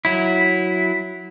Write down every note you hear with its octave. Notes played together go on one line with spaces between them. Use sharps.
F#3 E4